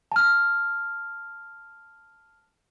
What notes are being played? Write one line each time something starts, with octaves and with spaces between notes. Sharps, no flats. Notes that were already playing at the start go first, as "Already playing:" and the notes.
A5 F6